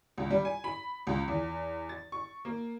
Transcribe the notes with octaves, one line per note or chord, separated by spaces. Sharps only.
C#2
G3
G#5
B5
C#2
E2
A6
C#6
A#3